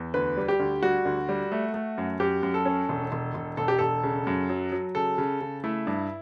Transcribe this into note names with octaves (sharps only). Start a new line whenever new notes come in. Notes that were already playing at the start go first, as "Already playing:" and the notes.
Already playing: E2
D2 B4
G3
G4
D2
G3 F#4
D2
G3
A3
A3
F#2
F#2 G4
F#2
A4
C#4
E1
E1
E1
E1 A4
G4
E1 A4
C#3
F#2
F#3
F#3
C#3 A4
C#3
C#3
A3 E4
G2